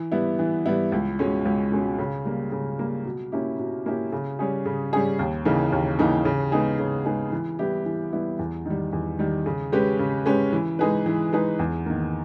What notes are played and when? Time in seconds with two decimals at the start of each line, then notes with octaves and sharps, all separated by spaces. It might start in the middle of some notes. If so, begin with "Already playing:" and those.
Already playing: E3
0.12 G3 B3 E4
0.39 E3
0.66 G3 B3 E4
0.92 C#2
1.19 B2 G#3 C#4
1.45 C#2
1.72 B2 G#3 C#4
1.98 C#3
2.25 G3 A#3
2.52 C#3
2.79 G3 A#3
3.06 B2
3.32 A#3 C#4 E4 G4
3.59 B2
3.86 A#3 C#4 E4 G4
4.12 C#3
4.39 G3 C#4 G#4
4.66 C#3
4.93 G3 C#4 G#4
5.19 D#2
5.45 C#3 E3 A#3 D#4
5.72 D#2
5.99 C#3 E3 A#3 D#4
6.25 C#3
6.52 G#3 B3 D#4 G#4
6.79 C#3
7.05 G#3 B3 D#4 G#4
7.32 E3
7.59 G3 B3 E4 G4
7.86 E3
8.12 G3 B3 E4 G4
8.39 E2
8.65 D#3 G3
8.93 E2
9.19 D#3 G3
9.46 C#3
9.72 G#3 C#4 G4 B4
9.99 C#3
10.26 G#3 C#4 G4 B4
10.53 E3
10.79 G#3 D#4 G#4 B4
11.06 E3
11.32 G#3 D#4 G#4 B4
11.59 E2
11.86 D#3 A#3